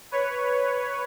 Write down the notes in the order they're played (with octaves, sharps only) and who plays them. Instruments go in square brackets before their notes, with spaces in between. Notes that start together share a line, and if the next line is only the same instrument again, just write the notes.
[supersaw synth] B4 C#5